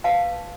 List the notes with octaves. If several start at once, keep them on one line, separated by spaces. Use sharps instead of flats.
B4 F5 A5